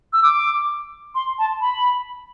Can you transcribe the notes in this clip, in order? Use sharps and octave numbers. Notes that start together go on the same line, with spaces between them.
E6
D6
C6
A5
B5